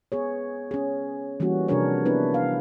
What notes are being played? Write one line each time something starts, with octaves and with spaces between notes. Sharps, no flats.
B3 G#4 C#5
C#4 G#4
E3 G3 A#3 C#4 F#4
C3 F3 D4 G#4 A#4 C#5
B3 D4 E4 B4
F5